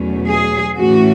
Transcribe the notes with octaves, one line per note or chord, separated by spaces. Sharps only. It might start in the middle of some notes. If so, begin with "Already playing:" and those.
Already playing: E2 B2 F#3 A3 C#4
G#4
A2 E3 A3 C#4 F#4